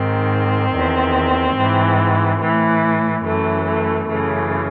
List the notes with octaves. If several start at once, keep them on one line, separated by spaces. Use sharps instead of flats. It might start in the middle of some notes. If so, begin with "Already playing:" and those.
Already playing: G#2 D#3 C4
E2 D#3
G#2 E3
A2 E3
F#2 E3 A3
A3
F#2 C#3 E3 A3